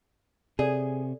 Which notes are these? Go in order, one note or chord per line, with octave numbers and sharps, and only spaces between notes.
C3 G#4 A4 C#5 D5